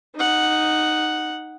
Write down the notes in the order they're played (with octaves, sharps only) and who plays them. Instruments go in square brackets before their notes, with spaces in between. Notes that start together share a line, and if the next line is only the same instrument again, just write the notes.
[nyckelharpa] D#4 F#5